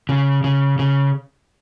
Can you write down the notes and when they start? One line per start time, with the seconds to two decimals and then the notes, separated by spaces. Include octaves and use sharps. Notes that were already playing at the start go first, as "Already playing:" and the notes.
0.09 C#3
0.44 C#3
0.79 C#3